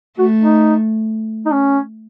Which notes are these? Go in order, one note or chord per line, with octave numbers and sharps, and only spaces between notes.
A3 F#4
D#4
D#4
C#4